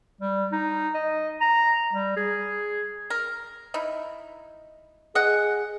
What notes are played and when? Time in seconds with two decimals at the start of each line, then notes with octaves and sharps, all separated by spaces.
0.21 G3
0.52 D#4
0.95 D#5
1.41 A#5
1.94 G3
2.17 G#4
3.10 A#4
3.74 D#4 E4
5.15 G#4 D#5 F#5